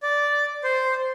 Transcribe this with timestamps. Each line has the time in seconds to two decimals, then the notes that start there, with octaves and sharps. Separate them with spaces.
0.03 D5
0.64 C5